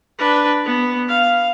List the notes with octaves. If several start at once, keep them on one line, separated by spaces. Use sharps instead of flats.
D4 B4
B3
F5